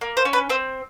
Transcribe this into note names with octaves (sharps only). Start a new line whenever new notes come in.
A#3
C5
C#4
B4
C4 C5